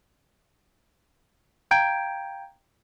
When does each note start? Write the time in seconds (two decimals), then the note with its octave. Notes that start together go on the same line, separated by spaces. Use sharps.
1.71 F5 G5 A#5 G6 G#6 D7